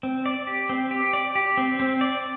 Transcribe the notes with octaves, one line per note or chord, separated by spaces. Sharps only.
C4
D5
G4
C4
G4
D5
G4
C4
C4
D5